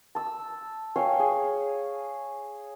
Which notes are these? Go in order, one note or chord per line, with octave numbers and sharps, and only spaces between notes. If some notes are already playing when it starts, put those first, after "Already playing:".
A5 E6
C#5 F5 G5 G#5
G#4